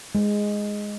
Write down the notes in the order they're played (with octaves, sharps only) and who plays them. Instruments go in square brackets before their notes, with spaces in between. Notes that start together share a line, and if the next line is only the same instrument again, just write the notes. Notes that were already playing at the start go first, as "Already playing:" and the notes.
[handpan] G#3